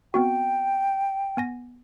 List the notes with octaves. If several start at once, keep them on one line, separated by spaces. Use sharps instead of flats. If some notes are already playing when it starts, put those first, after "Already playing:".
B3 C4 F#4 G5
B3 G#5 A#6